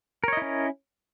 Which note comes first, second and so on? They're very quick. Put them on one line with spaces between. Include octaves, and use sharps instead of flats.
A#4 C#5 D#5 E4 C#4